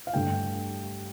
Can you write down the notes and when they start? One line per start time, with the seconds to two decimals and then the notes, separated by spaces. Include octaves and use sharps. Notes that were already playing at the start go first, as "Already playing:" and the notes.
0.07 F5
0.13 G2 D3 A3 G5